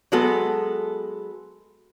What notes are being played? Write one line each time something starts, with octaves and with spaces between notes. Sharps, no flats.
F#3 G#3 B3 F#4 A4